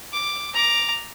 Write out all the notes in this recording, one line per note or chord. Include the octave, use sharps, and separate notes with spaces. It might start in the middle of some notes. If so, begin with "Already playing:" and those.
D6
A#5 D6